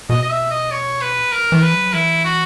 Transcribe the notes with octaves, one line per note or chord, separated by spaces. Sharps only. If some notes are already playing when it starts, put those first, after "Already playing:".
B2 D#5
D#5
E5
D#5
C#5
B4
A#4
E3
B4
F#3
E3 E4
F#4